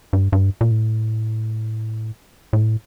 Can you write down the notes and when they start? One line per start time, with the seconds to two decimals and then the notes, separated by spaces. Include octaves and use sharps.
0.13 G2
0.32 G2
0.61 A#2
0.71 A2
2.53 A2